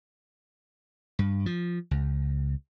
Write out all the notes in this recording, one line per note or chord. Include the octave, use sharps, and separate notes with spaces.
G2
F3
C#2